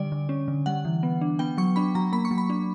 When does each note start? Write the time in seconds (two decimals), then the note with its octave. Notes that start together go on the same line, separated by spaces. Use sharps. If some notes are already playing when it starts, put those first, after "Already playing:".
Already playing: D3 G3 D5
0.12 D3
0.29 C#4
0.48 D3
0.66 G3 F#5
0.85 E3
1.03 B3
1.21 D4
1.39 B3 G5
1.58 F#3 C#6
1.76 D4 B5
1.95 F#3 A#5
2.12 A#3 B5
2.25 C#6
2.31 F#3
2.38 B5
2.50 D4